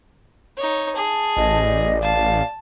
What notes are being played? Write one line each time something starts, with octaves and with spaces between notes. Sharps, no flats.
D#4 C#5
G#4 A5
A1 D#5
D5
F5 A5